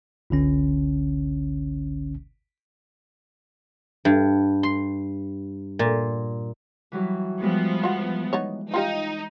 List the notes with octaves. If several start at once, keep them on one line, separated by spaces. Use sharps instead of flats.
G1 C#2 D3 C#4
G2
C6
A#2
E3 F#3 G3
F3 G3 G#3 B3
F4 F#4
B3 D#4 C#5
D#4 F4 G4 F5